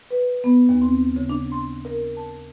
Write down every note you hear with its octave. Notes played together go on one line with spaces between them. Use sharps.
B4
B3
D#2
C4
C#3
D4
C6
A#4
A5